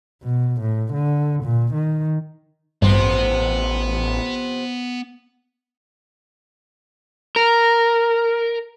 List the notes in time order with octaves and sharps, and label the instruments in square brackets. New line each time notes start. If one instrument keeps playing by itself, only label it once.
[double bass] B2
A2
D3
A#2
D#3
[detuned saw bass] A1 [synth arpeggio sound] G2 [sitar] C3 F3 C5 [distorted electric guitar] B3
[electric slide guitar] A#4